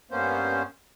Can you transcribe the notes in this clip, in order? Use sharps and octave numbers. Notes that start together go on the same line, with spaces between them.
G2 A#3 B3 C#4 C5